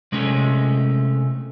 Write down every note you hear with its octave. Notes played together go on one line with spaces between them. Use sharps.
C3 G#3 A3 C#4